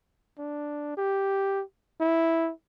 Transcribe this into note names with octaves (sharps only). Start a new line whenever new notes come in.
D4
G4
E4